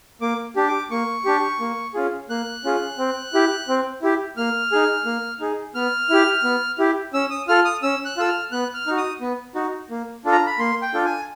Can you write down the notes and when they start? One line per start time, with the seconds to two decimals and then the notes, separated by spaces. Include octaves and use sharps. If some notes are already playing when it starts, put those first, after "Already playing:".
0.21 A#3 D6
0.56 D4 G4
0.68 D6
0.91 A#3 C#6
1.25 D4 G4
1.60 A#3
1.94 C#4 F4 G#4
2.30 A#3 F#6
2.64 C#4 F4 G#4
2.98 C4
3.33 E4 G4
3.68 C4
4.02 E4 G4
4.37 A#3 F6
4.72 D#4 G#4
5.05 A#3
5.40 D#4 G#4
5.75 B3 F6
6.10 E4 G4
6.44 B3
6.79 E4 G4
7.14 C#4 E6
7.30 D#6
7.48 F4 A4 F6
7.65 D#6
7.83 C#4 E6
8.05 F#6
8.17 F4 A4 E6
8.28 F6
8.52 B3 F#6
8.74 F6
8.87 D#4 F#4
8.97 D#6
9.21 B3
9.55 D#4 F#4
9.90 A#3
10.25 D4 F4 A4
10.32 A#5
10.46 B5
10.59 A#3 C6
10.82 G5
10.94 D4 F4 A4
11.05 G#5